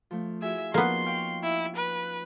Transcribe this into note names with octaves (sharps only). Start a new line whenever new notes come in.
F3 A3
E4 F#4 G#4 E5
F3 A#3 B3 C#4 D#4 C6
F5 G5 C#6
E4
B4